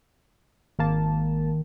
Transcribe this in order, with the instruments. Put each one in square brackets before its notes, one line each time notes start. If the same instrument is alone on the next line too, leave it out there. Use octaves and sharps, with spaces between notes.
[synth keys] G#1 A#3 A5 [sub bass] D#3